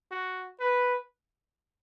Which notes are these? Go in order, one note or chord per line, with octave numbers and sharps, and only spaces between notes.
F#4
B4